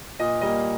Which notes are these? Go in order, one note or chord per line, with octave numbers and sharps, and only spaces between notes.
A#2 D#5
G3 A#3 D#5